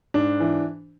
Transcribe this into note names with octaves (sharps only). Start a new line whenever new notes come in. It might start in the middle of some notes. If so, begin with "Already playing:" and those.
G#2 D4
E3